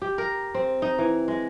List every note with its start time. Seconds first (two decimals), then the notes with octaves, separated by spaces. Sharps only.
0.02 G4
0.18 A#4
0.54 C4
0.82 D#4
0.98 E3
1.28 G#3